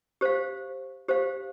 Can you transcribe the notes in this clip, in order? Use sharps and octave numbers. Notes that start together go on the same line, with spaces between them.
G4 C5 F5
G4 C5 F5